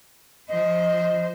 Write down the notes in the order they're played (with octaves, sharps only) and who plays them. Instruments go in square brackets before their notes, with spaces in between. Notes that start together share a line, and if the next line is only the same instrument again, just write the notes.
[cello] F3 C5 [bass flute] D#5